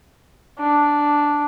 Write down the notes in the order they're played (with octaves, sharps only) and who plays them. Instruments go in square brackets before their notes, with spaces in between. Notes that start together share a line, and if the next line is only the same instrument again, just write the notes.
[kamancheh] D4